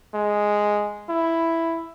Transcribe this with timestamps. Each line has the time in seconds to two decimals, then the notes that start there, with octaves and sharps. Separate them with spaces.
0.15 G#3
1.09 E4